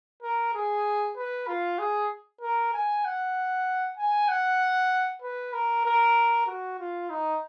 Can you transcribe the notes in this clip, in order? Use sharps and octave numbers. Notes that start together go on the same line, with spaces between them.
A#4
G#4
B4
F4
G#4
A#4
G#5
F#5
G#5
F#5
B4
A#4
A#4
F#4
F4
D#4